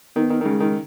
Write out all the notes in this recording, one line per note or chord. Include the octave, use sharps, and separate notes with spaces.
D#3 B3
D#3
D#3
C#3 G#3
D#3